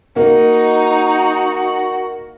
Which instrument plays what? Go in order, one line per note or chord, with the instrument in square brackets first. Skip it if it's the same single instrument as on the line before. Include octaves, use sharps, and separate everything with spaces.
[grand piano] A#3 [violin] D#4 [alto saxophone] F#4 [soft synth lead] D#5